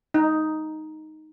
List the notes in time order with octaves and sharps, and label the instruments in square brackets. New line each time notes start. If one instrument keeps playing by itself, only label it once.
[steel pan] D#4